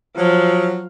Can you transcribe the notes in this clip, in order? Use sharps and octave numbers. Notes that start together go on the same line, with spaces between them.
F3 F#3